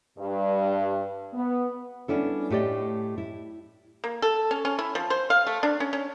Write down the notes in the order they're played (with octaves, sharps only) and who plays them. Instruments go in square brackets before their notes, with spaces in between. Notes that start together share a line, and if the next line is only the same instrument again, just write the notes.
[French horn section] G2
B3
[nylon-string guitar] G3 B3 C#4 D4 E4 A4
A2 A3 G4 D5 D#5
E4
[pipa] A#3
A4
C#4
C#4
E4
F3
C5
F5
A3
D4
C#4
C#4